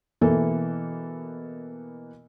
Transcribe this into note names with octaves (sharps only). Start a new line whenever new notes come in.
B2 E3 A#3 A4